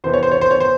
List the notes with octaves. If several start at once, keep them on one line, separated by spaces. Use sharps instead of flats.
E2 C3 E3 C5
C#5
C5
C#5
C5
C#5
C5